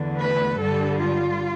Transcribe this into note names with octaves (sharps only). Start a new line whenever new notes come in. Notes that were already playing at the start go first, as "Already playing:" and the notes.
Already playing: E2 D3 A3
B4
G2 D3 G3 A4
F4